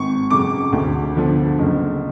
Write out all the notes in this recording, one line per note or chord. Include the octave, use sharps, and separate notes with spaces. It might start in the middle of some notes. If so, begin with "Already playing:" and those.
Already playing: G#1 C#6
F#2 C#3 D6
D2
D3 F3 B3
F#1